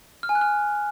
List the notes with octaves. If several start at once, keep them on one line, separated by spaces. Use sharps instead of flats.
F6
G#5
F#6
F6